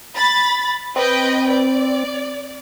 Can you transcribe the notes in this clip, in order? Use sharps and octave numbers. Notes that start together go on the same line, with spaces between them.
B5 A6
C4 B4 D#5 G5
D5